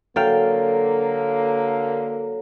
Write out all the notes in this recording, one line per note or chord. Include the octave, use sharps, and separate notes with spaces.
D3 F#3 A#3 A4 F5 G5